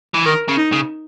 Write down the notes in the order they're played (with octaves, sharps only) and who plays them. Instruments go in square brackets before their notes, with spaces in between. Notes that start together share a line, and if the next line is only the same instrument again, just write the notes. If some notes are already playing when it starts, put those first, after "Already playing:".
[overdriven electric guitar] E3
[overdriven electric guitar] D#3 [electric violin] A#4
[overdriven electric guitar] C#3
[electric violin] D#4
[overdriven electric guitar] C#3